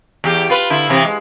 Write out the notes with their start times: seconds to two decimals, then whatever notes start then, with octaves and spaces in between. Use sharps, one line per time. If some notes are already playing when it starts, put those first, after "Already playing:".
0.24 E2 G4
0.50 F4 B4
0.70 D3 E4
0.89 C3 E3
1.04 G#3